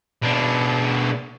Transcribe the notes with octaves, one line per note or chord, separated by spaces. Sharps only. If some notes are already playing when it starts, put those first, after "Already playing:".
B2 D4